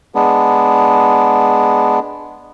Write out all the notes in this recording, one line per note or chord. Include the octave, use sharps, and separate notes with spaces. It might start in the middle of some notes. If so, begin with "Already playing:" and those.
G#3 B3 D4